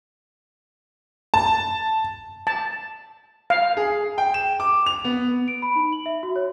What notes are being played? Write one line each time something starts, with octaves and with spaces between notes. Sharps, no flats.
A5
A5
F5
G#4
G5
E7
D6
F7
B3
D7
B5
D#4
F#7
E5
F#4
C#5